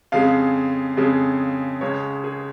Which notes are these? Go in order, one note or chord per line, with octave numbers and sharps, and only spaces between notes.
F2 C#3 G#3 F5
F2 C#3 G#3
C#2 C#3 G#3 C#5
G#4